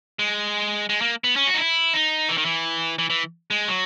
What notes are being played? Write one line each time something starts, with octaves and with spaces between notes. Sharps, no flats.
G#3
G#3
A#3
B3
C#4
F#4
D#4
E4
D#4
E3
D#3
E3
E3
E3
G#3
F#3